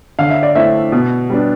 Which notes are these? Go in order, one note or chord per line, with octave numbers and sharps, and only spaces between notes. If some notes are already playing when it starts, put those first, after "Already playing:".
D3 F5
E5
D5
A3 C4 E4 E5
B2
G3 B3 D4